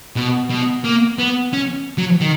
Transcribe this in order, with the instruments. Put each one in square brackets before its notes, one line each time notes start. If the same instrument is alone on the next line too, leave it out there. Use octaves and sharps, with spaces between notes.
[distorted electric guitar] B2
B2
A#3
B3
C#4
F#3
D#3